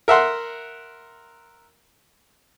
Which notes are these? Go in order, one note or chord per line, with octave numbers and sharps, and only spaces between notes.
A#4 E5 F#5 C6